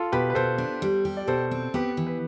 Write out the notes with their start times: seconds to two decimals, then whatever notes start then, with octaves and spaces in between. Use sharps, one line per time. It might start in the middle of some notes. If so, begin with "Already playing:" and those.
Already playing: F4 A4
0.12 B2 G4 B4
0.30 B4
0.35 B2 A4 C5
0.58 D4
0.82 G3
1.05 G4
1.17 D5
1.27 B2 A4 C5
1.51 C4
1.74 B3 G4 B4
1.97 E3
2.07 B4